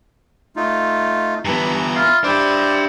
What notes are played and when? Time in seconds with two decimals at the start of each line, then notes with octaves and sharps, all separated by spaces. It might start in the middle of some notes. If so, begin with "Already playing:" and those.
0.56 A3 D#4 F4
1.45 G2 E3 B3 A#5
1.95 E4 F4 C6
2.24 D4 E4 G4 C5 D5